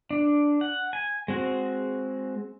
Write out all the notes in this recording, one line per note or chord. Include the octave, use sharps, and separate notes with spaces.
D4
F#5
G#5
G#3 C4 F#4